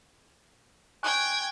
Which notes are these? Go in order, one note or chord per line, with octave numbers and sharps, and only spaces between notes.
G5 G#5 C#6 F#6 G#6